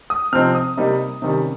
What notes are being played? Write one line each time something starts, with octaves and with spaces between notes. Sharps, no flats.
D#6
C3 F3 C4 D#4 F6
D#6
C3 G3 A#3 D#4
C3 D#3 G3 C#4